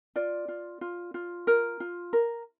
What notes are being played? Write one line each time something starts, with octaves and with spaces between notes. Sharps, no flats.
F4 D5
F4
F4
F4
A#4
F4
A#4